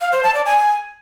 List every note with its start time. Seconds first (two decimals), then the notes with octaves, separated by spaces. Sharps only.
0.01 F5
0.12 C5
0.23 A5
0.34 D5
0.46 G#5